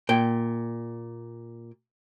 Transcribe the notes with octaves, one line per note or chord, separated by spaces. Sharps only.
A#2 G5